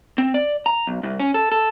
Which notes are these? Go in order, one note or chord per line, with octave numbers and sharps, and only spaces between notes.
C4
D5
A#5
B1
C2
C#4
A4
A4